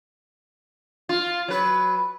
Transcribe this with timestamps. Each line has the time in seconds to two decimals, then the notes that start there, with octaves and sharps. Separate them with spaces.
1.09 F4
1.48 F#3 B4